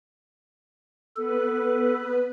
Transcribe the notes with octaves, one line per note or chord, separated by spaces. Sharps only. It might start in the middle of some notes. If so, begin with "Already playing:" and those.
B3 A4 B4